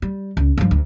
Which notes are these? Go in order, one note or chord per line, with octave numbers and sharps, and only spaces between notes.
G3
C#2
G2 F3
D2